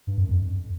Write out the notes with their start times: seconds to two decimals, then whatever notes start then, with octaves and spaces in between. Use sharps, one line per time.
0.07 G2
0.18 F#2
0.29 F2